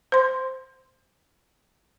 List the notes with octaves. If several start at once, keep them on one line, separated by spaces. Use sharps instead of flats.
C5 C6